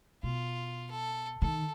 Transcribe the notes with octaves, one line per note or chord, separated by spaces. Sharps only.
B2 F4
A4
D#3 A4